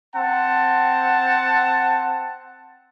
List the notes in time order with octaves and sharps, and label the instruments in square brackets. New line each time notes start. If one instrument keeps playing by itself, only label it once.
[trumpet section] C4 F#5 A5